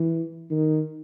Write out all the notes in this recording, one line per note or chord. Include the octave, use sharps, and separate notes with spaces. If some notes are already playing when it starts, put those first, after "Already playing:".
Already playing: E3
D#3